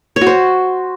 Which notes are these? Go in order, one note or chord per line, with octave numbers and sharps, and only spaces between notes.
C#5
F#4
C5